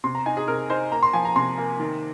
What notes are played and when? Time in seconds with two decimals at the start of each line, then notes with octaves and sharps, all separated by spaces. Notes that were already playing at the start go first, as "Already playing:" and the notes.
0.04 C3 C6
0.15 A#5
0.26 D#4 G#5
0.37 G#4
0.48 C3 A#4
0.70 D#4 C5
0.92 A#3 A#5
1.03 C6
1.13 F3 G#5
1.25 A#5
1.36 C3 C6
1.58 A#3
1.80 D#3